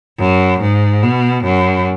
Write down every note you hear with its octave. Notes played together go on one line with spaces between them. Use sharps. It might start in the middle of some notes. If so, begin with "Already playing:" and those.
F#2
G#2
B2
F#2